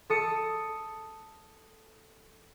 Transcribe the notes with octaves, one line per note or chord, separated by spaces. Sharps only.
A4 D#6 C#7